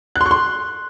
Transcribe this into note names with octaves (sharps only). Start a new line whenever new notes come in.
F#6
C6
C#6
C6